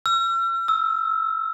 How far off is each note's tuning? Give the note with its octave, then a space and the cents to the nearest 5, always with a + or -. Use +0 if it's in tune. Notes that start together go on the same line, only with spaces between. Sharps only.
E6 +45
E6 -15